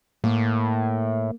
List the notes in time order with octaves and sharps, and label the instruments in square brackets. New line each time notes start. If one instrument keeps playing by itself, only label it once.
[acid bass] A2 [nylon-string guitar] A#3